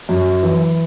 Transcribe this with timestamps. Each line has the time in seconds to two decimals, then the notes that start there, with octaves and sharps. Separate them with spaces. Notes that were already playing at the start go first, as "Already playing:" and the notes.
0.09 F#2
0.43 E3